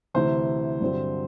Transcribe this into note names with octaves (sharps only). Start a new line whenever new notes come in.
D2 C3 E3 C5
G2 D3 F#3 C4